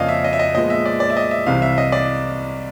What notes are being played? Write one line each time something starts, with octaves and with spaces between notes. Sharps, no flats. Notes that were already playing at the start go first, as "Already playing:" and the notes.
Already playing: F2 C#3 F3 A#3 D5 D#5 F5
E5
D#5
E5
D#5
A#2 F3 G#3 B3 D#5
E5
D5
D5
E5
D#5
E5
C2 C3 E3 F5
E5
D#5
D5